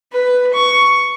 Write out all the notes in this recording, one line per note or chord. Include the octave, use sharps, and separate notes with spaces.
B4
C#6